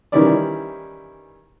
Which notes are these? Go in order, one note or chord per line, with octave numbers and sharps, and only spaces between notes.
D#3 E3 G3 C#4 E4 D5